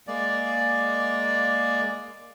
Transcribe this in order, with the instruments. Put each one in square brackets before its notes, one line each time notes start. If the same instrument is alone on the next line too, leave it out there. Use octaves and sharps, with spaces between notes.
[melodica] G#3 A#3 D5